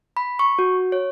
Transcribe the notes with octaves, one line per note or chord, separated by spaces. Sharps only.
B5
C#6
F#4
C#5